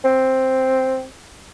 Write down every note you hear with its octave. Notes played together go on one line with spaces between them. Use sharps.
C4